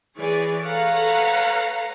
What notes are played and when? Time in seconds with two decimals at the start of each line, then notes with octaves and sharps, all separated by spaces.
0.17 E3 G#4 C#5 D5
0.62 A4 B4 C#5 F5 F#5 A#5